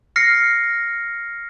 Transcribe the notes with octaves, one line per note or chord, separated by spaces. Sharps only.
F6 A#6 C7 C#7